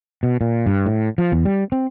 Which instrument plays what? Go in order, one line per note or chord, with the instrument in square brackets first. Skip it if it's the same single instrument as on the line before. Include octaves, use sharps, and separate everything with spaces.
[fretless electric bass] B2
A#2
G2
A2
F3
E2
G3
C4